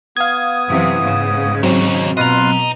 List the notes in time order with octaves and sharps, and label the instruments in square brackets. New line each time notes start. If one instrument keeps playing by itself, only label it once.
[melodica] B3 D#6 [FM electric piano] F5 G#6
[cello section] F#2 C3 E3
G#2 C#3
[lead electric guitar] D#3 C#5 [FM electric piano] F#3 C4
[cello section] B2 [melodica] F4 B4 C6 [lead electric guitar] D#5 A#5